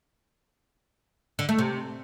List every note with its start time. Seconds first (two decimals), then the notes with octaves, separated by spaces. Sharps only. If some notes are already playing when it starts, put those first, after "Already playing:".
1.39 D3
1.49 A3
1.59 C3